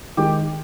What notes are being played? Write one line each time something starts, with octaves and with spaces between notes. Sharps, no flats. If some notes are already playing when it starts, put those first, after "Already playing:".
D#3 G#3 G4